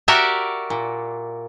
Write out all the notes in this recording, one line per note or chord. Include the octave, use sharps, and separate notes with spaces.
F#4 G4 A#4 D5 E5
A#2